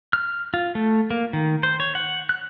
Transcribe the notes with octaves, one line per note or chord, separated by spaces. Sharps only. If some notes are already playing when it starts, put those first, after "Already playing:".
F6
F4
A3
A#3
D#3
C5
C#5
F#5
F#6